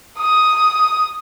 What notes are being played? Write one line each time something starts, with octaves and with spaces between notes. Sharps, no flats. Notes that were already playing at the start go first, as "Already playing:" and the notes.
D#6